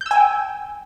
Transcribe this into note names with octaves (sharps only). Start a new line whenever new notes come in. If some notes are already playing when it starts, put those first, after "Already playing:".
G5 G#5 E6 G6